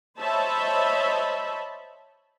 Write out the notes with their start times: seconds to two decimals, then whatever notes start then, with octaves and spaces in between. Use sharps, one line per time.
0.19 C5 C#5 D#5 E5 A5 B5